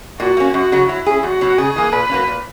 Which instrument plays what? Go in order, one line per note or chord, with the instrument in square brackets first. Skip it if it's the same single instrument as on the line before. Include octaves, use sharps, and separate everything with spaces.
[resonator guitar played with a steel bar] A#2 [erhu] F#4
[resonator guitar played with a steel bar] A#3 C#4
[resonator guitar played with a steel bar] F#2 [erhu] F#4
[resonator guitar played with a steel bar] C#3 F#3 C#4
[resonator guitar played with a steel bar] F#3 [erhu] E4
[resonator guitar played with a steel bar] C#4 G#4
[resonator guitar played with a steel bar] E2 [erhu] F#4
[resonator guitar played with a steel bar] B2 F#3
[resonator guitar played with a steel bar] C#3 [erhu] G#4
[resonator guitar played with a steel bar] E3 A#3
[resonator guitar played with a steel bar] A#2 [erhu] B4
[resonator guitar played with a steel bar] F#3 A#3 C#4
A#2